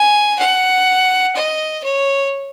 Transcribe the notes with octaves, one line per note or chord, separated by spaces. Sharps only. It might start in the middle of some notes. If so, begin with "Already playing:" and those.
Already playing: G#5
F#5
D#5
C#5